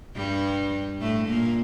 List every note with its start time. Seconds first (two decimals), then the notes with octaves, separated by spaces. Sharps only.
0.16 G2 G3
1.01 A2 A3
1.28 A#2 A#3